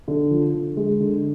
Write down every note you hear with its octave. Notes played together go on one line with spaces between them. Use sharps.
D3
F3
D3
G#3
D3